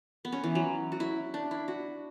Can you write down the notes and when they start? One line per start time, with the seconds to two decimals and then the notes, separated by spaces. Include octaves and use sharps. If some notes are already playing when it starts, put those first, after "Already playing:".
0.25 B3
0.32 C#4
0.44 E3
0.55 F#3
0.92 F#4
1.00 E4
1.34 D4
1.51 E4
1.68 F#4